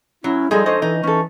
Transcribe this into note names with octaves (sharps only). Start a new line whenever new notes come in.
F#3 C#4 E4
F3 G3 G#3 D#4 G#4 A4
D4 A4 C5 C#5 D#5
E3 D#4
E3 C#4 A4 C#6